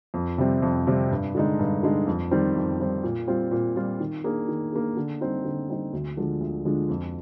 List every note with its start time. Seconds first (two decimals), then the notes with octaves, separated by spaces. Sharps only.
0.14 F2
0.38 C3 G3 C4
0.62 F2
0.87 C3 G3 C4
1.11 G2
1.35 D3 G#3 D#4
1.59 G2
1.83 D3 G#3 D#4
2.07 F2
2.31 D#3 G3 C4
2.55 F2
2.80 D#3 G3 C4
3.03 A#2
3.27 G3 C4 F4
3.51 A#2
3.76 G3 C4 F4
4.00 D#3
4.24 A#3 D4 G#4
4.48 D#3
4.72 A#3 D4 G#4
4.96 D3
5.21 G3 C4 D#4
5.45 D3
5.69 G3 C4 D#4
5.93 D2
6.17 D3 F3 G#3 D4
6.41 D2
6.65 D3 F3 G#3 D4
6.89 F2